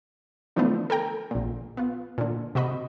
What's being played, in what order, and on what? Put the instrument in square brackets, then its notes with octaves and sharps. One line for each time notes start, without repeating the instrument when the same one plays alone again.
[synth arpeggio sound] D3 E3 F3 A3 B3 D4
A4 A#4 G5 A#5
A#1 A#2
B3 F4
A#2 D3
C3 F#4 D#5 B5